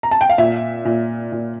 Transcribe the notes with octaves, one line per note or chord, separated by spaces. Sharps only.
A#5
A5
G5
F5
A#2 E5
A#2
A#2